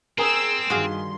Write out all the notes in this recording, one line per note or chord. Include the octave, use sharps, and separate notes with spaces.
C4 G#4 A#4 G5 G#5 D#6 E6
G2 D#3 F#4 G#4 F5 C6